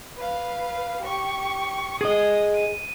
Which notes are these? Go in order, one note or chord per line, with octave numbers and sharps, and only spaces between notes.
B4 F5
G4 C#6
G#4 D#5 D#6
D#7